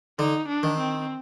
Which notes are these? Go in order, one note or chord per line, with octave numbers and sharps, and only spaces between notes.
D3 D#4
D4
D#3
C4